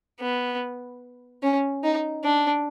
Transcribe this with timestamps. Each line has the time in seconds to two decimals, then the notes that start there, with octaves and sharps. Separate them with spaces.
0.21 B3
1.43 C#4
1.84 D#4
2.24 D4